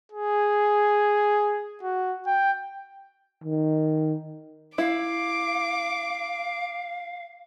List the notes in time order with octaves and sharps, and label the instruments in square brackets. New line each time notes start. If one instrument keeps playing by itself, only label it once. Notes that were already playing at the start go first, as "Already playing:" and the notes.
[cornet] G#4
F#4
G5
[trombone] D#3
[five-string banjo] E4 [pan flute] F5 [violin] D6